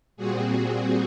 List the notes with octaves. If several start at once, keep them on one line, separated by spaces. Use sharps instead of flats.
A#2 G3 C4 F#4 G#4